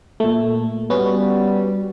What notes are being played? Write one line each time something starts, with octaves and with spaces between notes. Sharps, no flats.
A#2 A3
G3 B3 C#4 F#4